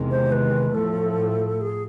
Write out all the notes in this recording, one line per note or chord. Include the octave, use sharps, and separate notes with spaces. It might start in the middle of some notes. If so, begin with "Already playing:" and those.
Already playing: E2 C3 D#3 G#3
C5
B4
A2 F3 A3 A4
G#4